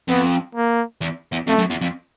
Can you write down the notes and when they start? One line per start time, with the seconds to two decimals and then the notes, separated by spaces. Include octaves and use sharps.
0.08 F2 B3
0.55 A#3
1.01 E2
1.32 E2
1.47 F2 A3
1.58 F#2
1.70 E2
1.81 F2